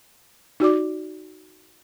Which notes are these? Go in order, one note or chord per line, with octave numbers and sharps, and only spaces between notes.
D#4 F#4 D5 D6